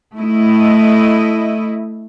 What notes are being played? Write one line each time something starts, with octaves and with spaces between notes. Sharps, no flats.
A3 E4 D#5